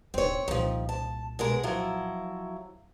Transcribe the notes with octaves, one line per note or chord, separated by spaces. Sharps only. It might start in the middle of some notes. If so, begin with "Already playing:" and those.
D1 C4 D#4 C#5
C2 A#2 D#3 F3
A5
B2 G#3 A#4
F3 F#3 E4